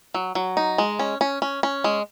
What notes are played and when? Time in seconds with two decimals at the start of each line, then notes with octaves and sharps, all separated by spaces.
0.14 F#3
0.35 F#3
0.57 D#4
0.78 G#3
0.99 C#4
1.21 C#4
1.42 C#4
1.63 C#4
1.84 G#3